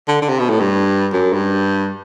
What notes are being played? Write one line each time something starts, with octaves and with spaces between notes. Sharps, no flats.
D3
D3
C3
B2
A2
G2
F#2
G2